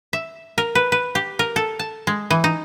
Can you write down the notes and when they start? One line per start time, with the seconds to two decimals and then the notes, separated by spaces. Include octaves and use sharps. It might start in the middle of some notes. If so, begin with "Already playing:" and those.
0.13 E5
0.58 A#4
0.75 B4
0.92 B4
1.15 G4
1.39 A#4
1.56 A4
1.79 A5
2.07 G#3
2.30 E3
2.44 D#4